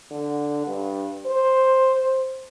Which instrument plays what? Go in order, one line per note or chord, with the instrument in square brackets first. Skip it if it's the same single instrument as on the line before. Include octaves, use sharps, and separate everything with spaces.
[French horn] D3
G2
C5